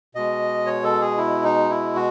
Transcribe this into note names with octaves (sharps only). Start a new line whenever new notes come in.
B2 G#3 D#5
C#5
A4
G#4
E4
D#4
E4
F#4